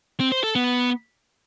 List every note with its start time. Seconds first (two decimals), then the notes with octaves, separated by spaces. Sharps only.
0.20 C4
0.32 C5
0.44 A4
0.55 B3